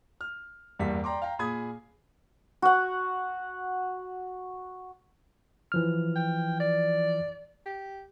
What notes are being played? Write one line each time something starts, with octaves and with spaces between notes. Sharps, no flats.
F6
E2 G2 G3 A#3 B6
D5 G5 A#5 C6 D6
F5 G5 A#5
A#2 G#4 B5 D#6 G#6
F#4 F#5
E3 F3 F6
G5
D5
G4